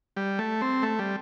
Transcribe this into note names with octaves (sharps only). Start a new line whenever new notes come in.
G3
A3
C4
A3
G3